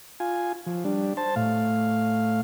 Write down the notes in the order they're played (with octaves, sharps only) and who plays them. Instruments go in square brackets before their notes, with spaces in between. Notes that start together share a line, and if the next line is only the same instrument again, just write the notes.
[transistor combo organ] F4 G#5
F3
G3 D4
C5 A5
A2 F5